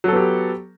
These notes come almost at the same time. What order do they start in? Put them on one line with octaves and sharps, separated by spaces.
F#3 A4 B3 G4